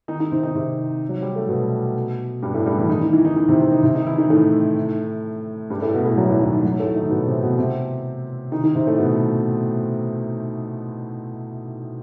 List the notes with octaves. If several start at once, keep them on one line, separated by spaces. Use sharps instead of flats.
D#3 D#4
D#3 D#4
C3 C4
D#3 D#4
C3 C4
F#3
G3
A3
B2 B3
G2 G3
A2 A3
G2 G3
E2 E3
D#3 D#4
D#3 D#4
E3 E4
D#3 D#4
D#3 D#4
C3 C4
C3 C4
D#3 D#4
C3 C4
D#3 D#4
E3 E4
D#3 D#4
A2 A3
G2 G3
A2 A3
B2 B3
A2 A3
F#2 F#3
E2 E3
D#2 D#3
F#2 F#3
A2 A3
D#3 D#4
B2 B3
C3 C4
B2 B3
C3 C4
D#3 D#4
D#3 D#4
C3 C4
A2 A3
B2 B3